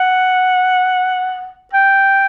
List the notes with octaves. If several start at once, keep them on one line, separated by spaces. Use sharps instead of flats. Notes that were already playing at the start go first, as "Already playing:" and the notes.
Already playing: F#5
G5